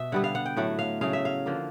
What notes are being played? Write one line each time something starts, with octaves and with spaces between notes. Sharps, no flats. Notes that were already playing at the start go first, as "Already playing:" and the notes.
Already playing: B2 E5
D3 G3 B3 F#5
F5
F#5
G5
A2 F#3 A3 F#5
F5
C#3 F#3 A3 F5
E5
F5
D3 F3 A#3